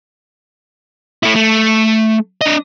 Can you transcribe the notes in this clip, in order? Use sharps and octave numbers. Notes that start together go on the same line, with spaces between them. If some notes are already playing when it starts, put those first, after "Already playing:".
A3 E4
A3
D4 D#5